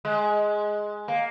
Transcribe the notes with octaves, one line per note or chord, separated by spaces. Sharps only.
G#3
A#3